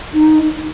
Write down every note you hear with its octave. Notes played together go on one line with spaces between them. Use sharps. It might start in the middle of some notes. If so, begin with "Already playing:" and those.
D#4